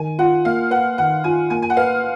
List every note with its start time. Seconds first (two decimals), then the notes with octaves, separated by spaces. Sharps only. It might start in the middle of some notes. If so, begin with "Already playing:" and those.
Already playing: D#3 G#5
0.18 F4 F#5
0.45 A#3 F5
0.71 B4 F#5
0.98 D#3 F#5
1.24 F4 G#5
1.50 A#3 G#5
1.62 G#5
1.70 F#5
1.77 B4 F5